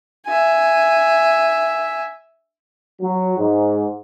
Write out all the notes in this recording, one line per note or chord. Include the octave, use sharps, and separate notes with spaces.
E5 G#5
F#3
G#2